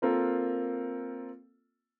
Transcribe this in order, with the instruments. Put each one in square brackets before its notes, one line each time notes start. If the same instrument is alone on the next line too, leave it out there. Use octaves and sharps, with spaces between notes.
[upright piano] A#3 C4 F4 A4 A#4